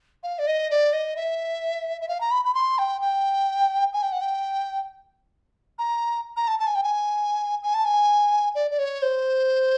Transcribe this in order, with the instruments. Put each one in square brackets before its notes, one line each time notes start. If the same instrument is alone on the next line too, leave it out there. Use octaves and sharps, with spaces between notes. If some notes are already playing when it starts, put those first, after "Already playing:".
[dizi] F5
D5
D#5
D5
D#5
E5
E5
F5
A#5
B5
B5
C6
G5
G5
G#5
G5
F#5
G5
A#5
A#5
A5
A5
G#5
G5
G#5
G#5
A5
G#5
D5
D5
C#5
C5